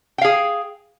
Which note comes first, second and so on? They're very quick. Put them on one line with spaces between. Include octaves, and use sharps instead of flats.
G5 F5 G#4